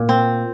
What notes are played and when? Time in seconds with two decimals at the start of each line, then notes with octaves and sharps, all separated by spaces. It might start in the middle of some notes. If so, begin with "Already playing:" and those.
Already playing: A#2
0.09 C4